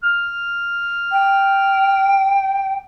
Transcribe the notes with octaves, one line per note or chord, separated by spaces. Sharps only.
F6
G5